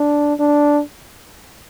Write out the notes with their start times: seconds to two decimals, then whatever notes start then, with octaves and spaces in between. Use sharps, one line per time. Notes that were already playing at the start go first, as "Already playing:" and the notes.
Already playing: D4
0.39 D4